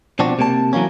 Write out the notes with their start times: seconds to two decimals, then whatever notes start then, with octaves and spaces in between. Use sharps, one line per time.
0.19 B2 F3 C4 D4 F#4
0.39 C3 A#3 A5
0.73 E3 F#3 G3 A#3 C#4